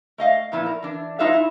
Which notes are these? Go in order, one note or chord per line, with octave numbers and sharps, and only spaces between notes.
A3 D#5 F5
A#2 F3 B3 E4
A#4
E3 D4
F#3 D#4 F4 B4 E5 F5
E4